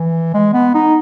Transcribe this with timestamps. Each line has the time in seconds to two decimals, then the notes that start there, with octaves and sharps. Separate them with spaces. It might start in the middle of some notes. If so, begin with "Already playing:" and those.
Already playing: E3
0.34 G#3
0.53 B3
0.75 D#4